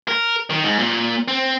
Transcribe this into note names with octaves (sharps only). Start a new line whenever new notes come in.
A#4
D#3
G#2
A#2
C4